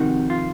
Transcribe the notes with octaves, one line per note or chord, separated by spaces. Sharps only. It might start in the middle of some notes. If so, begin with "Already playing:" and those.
Already playing: F2 C3 D#3 F#4
F4